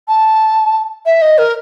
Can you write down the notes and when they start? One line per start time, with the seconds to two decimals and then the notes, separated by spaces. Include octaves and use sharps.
0.08 A5
1.06 E5
1.22 D#5
1.38 A#4